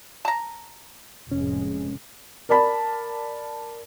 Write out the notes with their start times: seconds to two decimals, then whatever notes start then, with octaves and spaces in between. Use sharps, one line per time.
0.25 A5 A#5
1.32 F1 A2 G#3 C#4
2.49 A#4 D5 A5 B5